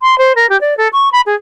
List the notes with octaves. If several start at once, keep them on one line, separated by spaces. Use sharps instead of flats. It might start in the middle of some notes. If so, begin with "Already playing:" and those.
C6
C5
A#4
G4
D5
A4
C#6
B5
G#4